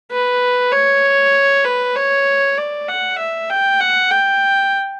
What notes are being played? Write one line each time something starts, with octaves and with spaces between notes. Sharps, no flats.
B4
C#5
B4
C#5
D5
F#5
E5
G5
F#5
G5